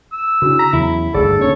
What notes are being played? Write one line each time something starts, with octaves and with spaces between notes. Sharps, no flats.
E6
C#3 D4 E4 F#4
A#5 B6
E2 C#3 F#3 E4
G1 D2 G#2 G#4 A4 D5
D3 A#3 C#4 C#5